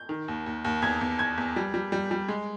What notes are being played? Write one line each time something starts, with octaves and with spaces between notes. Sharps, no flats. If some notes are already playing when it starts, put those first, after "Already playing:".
Already playing: G6
D#3
D#2
D#2
D#2
E2 G#6
E2
E2 G#6
E2
G3
G3
G3
G3
G#3